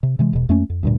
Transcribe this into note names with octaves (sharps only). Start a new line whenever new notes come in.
C3
C3 E3 G#3
E1 B2
F2 A3 A#3 C#4
F2
D2 G2 A#2